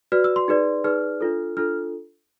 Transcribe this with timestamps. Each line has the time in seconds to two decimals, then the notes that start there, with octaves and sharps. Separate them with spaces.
0.12 F#4 B4 D5 F6
0.24 E6
0.36 C6
0.48 D#4 G#4 B4 D5
0.84 D#4 G#4 B4 D5 F6
1.21 D4 F4 A4
1.57 D4 F4 A4 F6